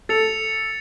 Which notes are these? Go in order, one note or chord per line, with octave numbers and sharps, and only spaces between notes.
A4 A6 C#7 F7